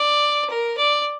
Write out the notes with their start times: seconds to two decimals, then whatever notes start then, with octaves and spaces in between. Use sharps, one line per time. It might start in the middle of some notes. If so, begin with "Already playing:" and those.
Already playing: D5
0.50 A#4
0.77 D5